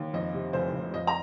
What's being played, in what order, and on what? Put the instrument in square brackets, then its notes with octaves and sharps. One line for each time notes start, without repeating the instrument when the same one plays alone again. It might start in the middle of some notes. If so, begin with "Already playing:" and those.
Already playing: [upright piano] D#2
F2 D#5
C3
F1 C5
F1
F2 D#5
A#5